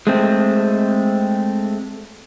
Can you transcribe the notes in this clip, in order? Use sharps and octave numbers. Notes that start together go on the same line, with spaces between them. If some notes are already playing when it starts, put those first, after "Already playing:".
G#3 A3 C4